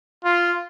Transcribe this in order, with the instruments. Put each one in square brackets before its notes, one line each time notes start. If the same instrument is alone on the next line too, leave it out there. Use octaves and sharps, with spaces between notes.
[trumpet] F4